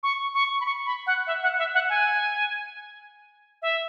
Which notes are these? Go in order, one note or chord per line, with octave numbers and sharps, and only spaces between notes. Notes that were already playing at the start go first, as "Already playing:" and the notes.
C#6
C#6
B5
C#6
B5
F#5
E5
F#5
E5
F#5
G#5
E5